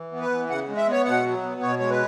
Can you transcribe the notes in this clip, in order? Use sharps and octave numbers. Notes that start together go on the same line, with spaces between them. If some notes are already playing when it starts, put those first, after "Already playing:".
Already playing: E3
B3
B4
E3
C#3 F#5
G#3
E5
B3 C#5
B2 F#5
F#3
B3
B2 C#5
G#3 C#5
B4